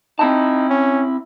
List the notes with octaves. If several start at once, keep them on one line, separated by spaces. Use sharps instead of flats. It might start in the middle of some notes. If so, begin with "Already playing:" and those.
C4 D#4 E4 A5
C#4